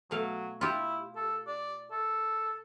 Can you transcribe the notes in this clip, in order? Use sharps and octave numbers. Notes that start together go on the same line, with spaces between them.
B2 F#3 A3 F5
E4 F4 G4
A4
D5
A4